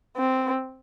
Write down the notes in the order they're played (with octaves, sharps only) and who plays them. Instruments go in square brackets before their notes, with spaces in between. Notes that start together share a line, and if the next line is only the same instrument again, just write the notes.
[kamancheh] C4